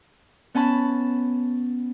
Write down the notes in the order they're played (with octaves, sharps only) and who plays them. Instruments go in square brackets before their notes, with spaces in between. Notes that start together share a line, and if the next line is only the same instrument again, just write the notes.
[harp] B3 C#4 A5 B5